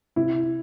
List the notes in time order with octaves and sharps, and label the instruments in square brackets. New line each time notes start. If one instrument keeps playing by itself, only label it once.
[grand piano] C3 E4